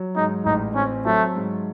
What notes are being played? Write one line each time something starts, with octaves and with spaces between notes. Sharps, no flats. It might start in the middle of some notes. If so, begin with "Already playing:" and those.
Already playing: F#3
G#2 D#4
A1 D#4
C4 C#4
F#3 A3
G#2